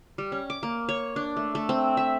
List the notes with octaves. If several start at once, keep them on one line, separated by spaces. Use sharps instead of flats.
G3
C#4
D6
A#3
C#5
D4
A3
A3
C4
E5